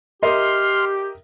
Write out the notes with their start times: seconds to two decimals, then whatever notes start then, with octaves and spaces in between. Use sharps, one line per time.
0.23 G4 A#4 D#5 E5 C6 F6